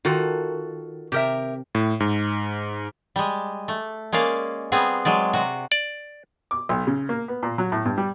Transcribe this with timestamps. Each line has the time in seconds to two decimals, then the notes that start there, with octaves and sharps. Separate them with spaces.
0.05 D#3 F4 F#4 A4
1.12 C3 G4 A#4 E5
1.75 A2
2.00 G#2
3.16 G3 G#3
3.68 A3
4.12 G#3 A#3 C#4 D5 F5
4.72 G3 B3 C4 G#4
5.05 F#3 G#3 D5
5.33 C3 F#4
5.72 D5
6.51 D6
6.69 B1
6.87 C#3
7.09 A#3
7.28 B3
7.43 A#2
7.58 F#3
7.72 A2
7.85 G2
7.98 G3